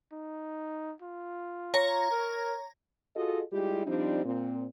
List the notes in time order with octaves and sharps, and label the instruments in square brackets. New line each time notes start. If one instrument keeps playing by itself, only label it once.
[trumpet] D#4
F4
[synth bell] C#5 A#6 [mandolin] A#5
[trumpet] A#4
[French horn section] F4 F#4 G#4 A4 D#5
G3 G#3 E4 F4 G4
F3 G3 C4 D4 D#4
A#2 C4